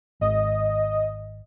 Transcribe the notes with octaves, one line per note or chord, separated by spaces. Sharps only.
G#1 D#5